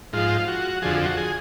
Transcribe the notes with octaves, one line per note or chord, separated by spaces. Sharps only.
G#2 F3 F4
F#4
F2 D3 F3 G#4
F#4
G#4